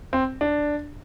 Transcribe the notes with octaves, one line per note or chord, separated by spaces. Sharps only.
C4
D4